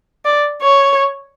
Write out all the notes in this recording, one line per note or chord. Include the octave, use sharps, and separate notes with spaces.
D5
C#5